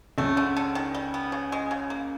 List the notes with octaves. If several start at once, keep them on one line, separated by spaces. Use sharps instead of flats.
C#2 C#3 A3
D3
D3
D#3
G3
B3
C#3
G#3
C#3
A#3